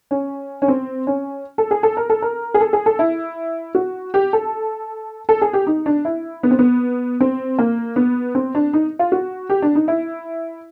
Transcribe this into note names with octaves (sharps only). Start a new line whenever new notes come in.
C#4
C#4
C4
C#4
A4
G#4
A4
A#4
A4
A#4
G#4
A4
G#4
A4
E4
F#4
G4
A4
A4
G#4
G4
D#4
D4
E4
B3
C4
B3
C4
A#3
B3
C4
D4
D#4
F4
F#4
G4
D4
D#4
E4